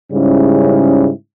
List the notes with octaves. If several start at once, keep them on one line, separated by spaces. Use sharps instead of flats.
G#2 C#3 G3 C#4 E4